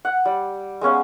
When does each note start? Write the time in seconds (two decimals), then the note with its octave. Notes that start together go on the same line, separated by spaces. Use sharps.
0.05 F#5
0.25 G3
0.81 G#3 B3 C#4 F5